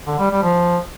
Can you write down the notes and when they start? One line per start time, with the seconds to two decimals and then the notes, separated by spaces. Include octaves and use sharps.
0.07 D3
0.19 G3
0.31 G3
0.43 F3